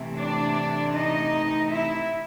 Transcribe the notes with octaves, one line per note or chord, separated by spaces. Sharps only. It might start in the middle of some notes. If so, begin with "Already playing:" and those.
Already playing: C3 E3 A3 C4
D4 D5
D#4 D#5
E4 E5